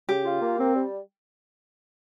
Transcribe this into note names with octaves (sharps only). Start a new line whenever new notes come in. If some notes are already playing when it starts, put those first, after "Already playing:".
C#3 G4
F4
A#3
C4
G3